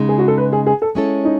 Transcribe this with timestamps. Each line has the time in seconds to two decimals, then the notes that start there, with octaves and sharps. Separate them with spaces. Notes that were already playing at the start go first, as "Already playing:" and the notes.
Already playing: C#3 G#3 D#4
0.09 G#4
0.18 F#4
0.28 A4
0.37 B4
0.53 G#4
0.66 G#4
0.82 A4
0.95 G#3 C#4 E4 A4 C#5
1.25 D#4